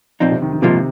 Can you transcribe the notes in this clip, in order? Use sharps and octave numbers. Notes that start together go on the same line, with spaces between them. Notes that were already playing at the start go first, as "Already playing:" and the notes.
A#2 F3 C4 D#4
C3
D#3
D#3
G#2 C3 F3 A#3 F4